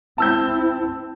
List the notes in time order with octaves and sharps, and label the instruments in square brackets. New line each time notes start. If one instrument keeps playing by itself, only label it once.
[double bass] C4 E4 [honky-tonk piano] A5 E6 G6